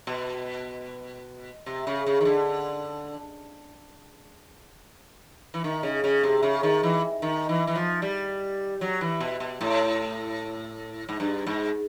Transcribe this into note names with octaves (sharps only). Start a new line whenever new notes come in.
B2
C3
C#3
C#3
D#3
D3
E3
D#3
C#3
C#3
C3
C#3
D#3
E3
D#3
E3
E3
F3
G3
F#3
E3
B2
B2
A2
G#2
G2
G#2